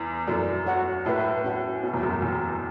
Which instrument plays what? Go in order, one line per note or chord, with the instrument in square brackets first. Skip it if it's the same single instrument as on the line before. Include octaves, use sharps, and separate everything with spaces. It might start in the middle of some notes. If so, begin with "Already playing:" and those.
Already playing: [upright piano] E2
[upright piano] F#2 [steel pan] C#4 E4 A4 D5
[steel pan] F#4 C#5 F#5
[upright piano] A2 [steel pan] B4 E5 A5
[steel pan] C#4 F#4 C#5 F#5
[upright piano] B2 [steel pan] F#4 C#5 E5
[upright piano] E2
F#2
[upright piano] E2 [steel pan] G4 C#5 G5